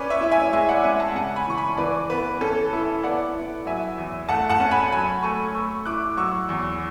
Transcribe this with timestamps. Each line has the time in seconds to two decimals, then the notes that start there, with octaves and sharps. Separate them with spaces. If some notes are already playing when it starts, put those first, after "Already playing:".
Already playing: C#4 B4 D5
0.10 C#5 E5
0.21 E4
0.32 E5 G#5
0.53 G#3 E5 G#5
0.69 D5 F#5
0.84 C#4 E5 G#5
0.99 F#5 A5
1.15 C#3 F#5 A5
1.36 G#5 B5
1.47 E3 C#6
1.57 G#5 B5
1.77 E3 B4 D5
2.10 B3 B4
2.41 C#4 A4
2.73 E4
3.03 B3 D5 F#5
3.35 E4
3.66 F#3 E5 G#5
3.98 E2
4.29 A3 F#5 A5
4.49 F#5 A5
4.60 C#4
4.71 G#5 B5
4.92 F#3 G#5 B5
5.23 A3 A5 C#6
5.55 A3 C#6 E6
5.85 E4 D6 F#6
6.17 F#3 C#6 E6
6.49 E2